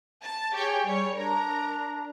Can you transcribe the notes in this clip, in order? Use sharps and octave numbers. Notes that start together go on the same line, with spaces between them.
A5 A6
G4 G#4 C#5 G5
G3 C#5
D4 A#4 A#5